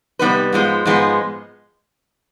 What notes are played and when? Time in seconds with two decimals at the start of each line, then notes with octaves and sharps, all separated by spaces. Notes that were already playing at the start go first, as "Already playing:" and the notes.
0.19 C3 G3 B3 D#4 B4
0.53 G#2 F3 G#3 B3
0.85 G#2 F3 G#3 B3